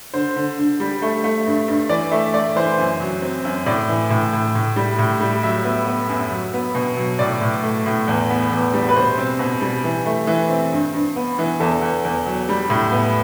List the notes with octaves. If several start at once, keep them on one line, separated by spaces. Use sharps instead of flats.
D3 C5
D3
D3
G3
A3
A3
G2
G2
E3 D5
A3 E5
A3 D5
E3 C5
F#2
F#3
C4
F#2
A2 D5
E3
A2
A2
A2
G3
A2
G3
F#3 E5
B3
B3
F#2
F#3
B3
B2
F#3
A2 D5
A2
A3
A2
E2
B3
E2
G3
B4
B2 C5
C4
B2
G3
E3
A3
E3
C4
G2
G2
B3
E3
E2 A4
E2
E2
F#3
G3
A2
B3